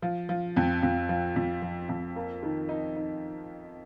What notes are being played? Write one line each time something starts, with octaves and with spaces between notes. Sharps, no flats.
F3
F3
F2
F2
F3
F2
F3
F2
A#3
D#3
D#4
D#4